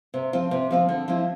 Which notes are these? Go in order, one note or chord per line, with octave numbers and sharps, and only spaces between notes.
C3
F3 C4 F4
C3
F3 C4 F4
D3
F3 C4 E4